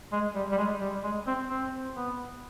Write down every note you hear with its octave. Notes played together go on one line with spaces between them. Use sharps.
G#3
G3
G3
G#3
G3
G#3
C4
C4
B3